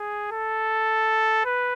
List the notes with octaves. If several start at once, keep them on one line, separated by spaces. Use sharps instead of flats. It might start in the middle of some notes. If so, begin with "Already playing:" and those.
Already playing: G#4
A4
B4